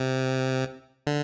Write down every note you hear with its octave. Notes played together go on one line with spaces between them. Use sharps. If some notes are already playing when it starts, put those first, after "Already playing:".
Already playing: C3
D3